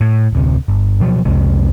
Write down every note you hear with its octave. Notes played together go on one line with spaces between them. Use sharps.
A2
D1 D2 C3
G1
B2 F3 F#3
C2 F2 C3 G#3